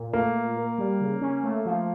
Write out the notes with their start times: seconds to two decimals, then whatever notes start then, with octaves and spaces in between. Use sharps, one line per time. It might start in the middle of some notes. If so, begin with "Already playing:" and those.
Already playing: A#2
0.13 A3 A#3
0.35 A#2
0.57 A#4
0.78 G3
1.01 C#3
1.21 C#4
1.44 A3
1.65 F3